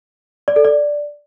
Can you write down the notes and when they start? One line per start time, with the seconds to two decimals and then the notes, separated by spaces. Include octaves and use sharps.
0.48 D5
0.56 A4
0.65 D5